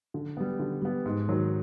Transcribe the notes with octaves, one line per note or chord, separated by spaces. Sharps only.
D3
G3 B3
D3
G3 B3
G#2
D#3 F#3